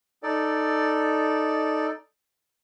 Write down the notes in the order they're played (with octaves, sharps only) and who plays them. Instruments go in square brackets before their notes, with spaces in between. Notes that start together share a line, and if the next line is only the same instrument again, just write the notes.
[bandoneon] D#4 A4 D5